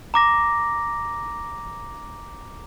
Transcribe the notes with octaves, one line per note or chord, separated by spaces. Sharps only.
A#5 D6 A#6